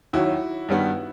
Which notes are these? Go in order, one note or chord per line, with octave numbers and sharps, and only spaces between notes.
D#2 D#3 F#3 E4 F#4
G2 D#3 G3 B3